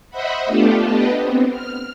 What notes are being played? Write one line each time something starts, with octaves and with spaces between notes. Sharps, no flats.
C5 D#5 E5 F#5 B5
A3 B3 D4 F4 G4 A4
B3 D4 G4 B4 D#5
B3 C4
F6